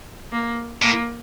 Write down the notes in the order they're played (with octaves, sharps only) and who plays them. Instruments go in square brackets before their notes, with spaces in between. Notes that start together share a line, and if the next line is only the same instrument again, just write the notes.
[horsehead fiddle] A#3
[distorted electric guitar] A2 [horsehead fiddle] A#3